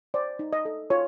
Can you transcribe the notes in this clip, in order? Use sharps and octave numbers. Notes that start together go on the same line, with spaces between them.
C5 D5
D#4
D#5
A4
F4 C#5